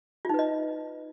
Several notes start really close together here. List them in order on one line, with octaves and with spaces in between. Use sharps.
F4 D#4 B4 D#5